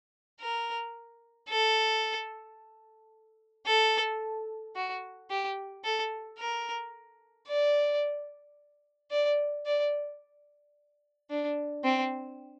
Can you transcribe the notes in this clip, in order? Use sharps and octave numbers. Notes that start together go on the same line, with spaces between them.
A#4
A4
A4
F#4
G4
A4
A#4
D5
D5
D5
D4
C4